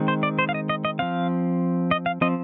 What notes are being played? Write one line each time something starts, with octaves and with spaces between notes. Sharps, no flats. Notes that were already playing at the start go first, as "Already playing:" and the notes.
Already playing: D#3 G#3 C4
C5
D5
C5
F5
D#5
D#5
D#5
F3 C4 F5
D#5
F5
F3 C4 D#5